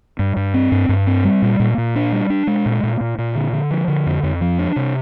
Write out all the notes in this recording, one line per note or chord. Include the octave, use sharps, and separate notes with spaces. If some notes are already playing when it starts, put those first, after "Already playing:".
G2
G2
C4
G2
G2
C4
G3
A#2
A#2
A#2
D4
G3
D4
G#3
A#2
A#2
A#2
A#2
D3
D3
F3
D3
F2
F2
F3
D4
C3